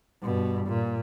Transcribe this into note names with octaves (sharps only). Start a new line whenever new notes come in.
G2 B2
A#2